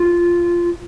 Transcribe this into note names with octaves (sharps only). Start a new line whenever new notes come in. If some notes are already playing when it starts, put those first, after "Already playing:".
Already playing: F4